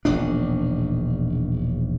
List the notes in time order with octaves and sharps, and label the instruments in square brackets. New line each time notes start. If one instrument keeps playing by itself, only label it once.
[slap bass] E1 A#1 D#3 D4